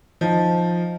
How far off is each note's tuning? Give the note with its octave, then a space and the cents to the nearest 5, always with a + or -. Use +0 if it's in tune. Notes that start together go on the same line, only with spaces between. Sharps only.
F3 +0 D#4 +0